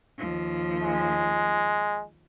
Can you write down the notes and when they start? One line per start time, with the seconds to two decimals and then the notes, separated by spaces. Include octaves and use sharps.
0.18 D#2 F3
0.83 G#3